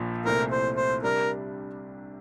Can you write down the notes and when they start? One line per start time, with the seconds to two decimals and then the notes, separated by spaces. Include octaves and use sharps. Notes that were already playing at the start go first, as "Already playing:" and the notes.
Already playing: A#1 A#2 F3
0.25 C2 A#2 A3 C4 E4 A#4
0.51 C5
0.77 C5
1.03 C3 G3 D4 A#4